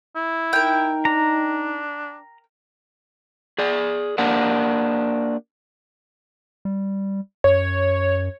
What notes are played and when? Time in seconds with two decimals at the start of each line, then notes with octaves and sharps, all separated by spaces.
0.16 E4
0.53 D#4 A#4 G5
1.05 D4 A#5
3.58 G#4 D5
4.18 A#3 D4 G4 A#4 F#5
6.65 G3
7.44 F#2 C#5